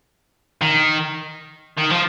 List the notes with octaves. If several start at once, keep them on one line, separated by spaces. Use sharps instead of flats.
D#3
D#3
F3